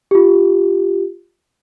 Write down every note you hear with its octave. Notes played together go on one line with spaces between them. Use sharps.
F4 G4